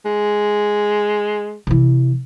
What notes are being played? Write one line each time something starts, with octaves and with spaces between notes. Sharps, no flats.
G#3
C3 E3